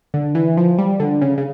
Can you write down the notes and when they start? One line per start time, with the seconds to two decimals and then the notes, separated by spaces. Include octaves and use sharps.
0.14 D3
0.35 E3
0.57 F3
0.78 G3
1.00 D3
1.22 C#3
1.38 C#3